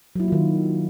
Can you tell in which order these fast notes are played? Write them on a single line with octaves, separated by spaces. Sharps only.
F#3 E4 A#3 F4 D#3